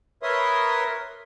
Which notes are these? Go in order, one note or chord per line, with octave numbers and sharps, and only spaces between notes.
A#4 B4 C#5 E5 C6 D#6